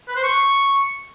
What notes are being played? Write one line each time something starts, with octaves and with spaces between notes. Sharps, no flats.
B4
C5
C#6